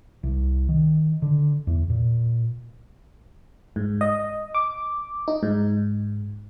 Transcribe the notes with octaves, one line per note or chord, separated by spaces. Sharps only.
C2
D#3
D3
E2
A#2
G#2
D#5
D6
D#4
G#2